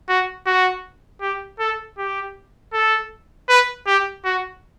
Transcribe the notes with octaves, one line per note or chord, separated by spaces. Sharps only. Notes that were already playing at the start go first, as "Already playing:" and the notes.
F#4
F#4
G4
A4
G4
A4
B4
G4
F#4